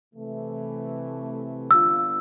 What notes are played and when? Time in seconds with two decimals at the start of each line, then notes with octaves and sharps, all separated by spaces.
0.14 C3 E3 A3
1.71 D3 G3 B3 D4 F4 E6